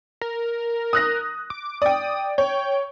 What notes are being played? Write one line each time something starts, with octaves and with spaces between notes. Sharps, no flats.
A#4
D#6 F#6 A#6
D6
D5 G5 D#6
C#5 G5